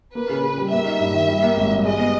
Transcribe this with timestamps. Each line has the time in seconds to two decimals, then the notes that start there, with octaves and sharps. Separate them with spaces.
0.14 A#3 B4
0.29 C#3
0.43 C#3
0.58 G3
0.72 A#3 E5
0.85 D#4
1.00 G2
1.14 D#3
1.28 G3
1.43 A#3
1.57 G#1
1.71 G2
1.85 G#3 D#5
1.99 B3